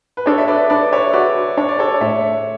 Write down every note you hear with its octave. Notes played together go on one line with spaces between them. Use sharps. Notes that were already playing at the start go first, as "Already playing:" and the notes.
B4
D4 A4 C#5
E5
B4 D5
D4 B4 D5
C#5 E5
F#4 B4 D5
D4 C#5
D5
A4 C#5
A2 C#5 E5